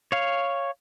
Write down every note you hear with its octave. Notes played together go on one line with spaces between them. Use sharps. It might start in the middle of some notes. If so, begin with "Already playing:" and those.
C#5 F5